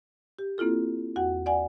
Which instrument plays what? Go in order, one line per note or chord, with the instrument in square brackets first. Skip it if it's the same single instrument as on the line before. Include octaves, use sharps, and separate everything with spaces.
[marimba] G4
A#3 C4 E4 F4 A4
E2 F#4 F#5
D5 F#5 G#5